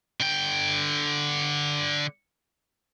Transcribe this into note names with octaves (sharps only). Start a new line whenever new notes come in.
D3 G5